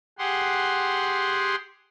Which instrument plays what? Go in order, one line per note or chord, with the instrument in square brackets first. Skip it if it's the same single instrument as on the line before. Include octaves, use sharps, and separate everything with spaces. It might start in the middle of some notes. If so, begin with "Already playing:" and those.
[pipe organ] G4 G#4 F#5 C6